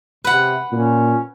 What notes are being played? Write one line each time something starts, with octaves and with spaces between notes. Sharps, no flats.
C3 B4 F#5
A#2 C#4